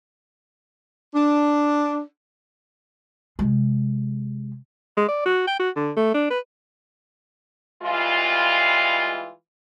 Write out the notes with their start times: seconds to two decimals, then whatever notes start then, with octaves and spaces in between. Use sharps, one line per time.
1.15 D4
3.39 C3 G#3
4.97 G#3
5.08 D5
5.26 F#4
5.47 G5
5.59 F#4
5.76 D3
5.97 A3
6.14 D4
6.30 B4
7.83 E3 G3 G#3 F4